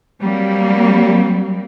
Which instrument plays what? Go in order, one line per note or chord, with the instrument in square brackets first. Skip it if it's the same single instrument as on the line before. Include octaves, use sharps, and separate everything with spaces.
[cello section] F#3 G3 A#3 C4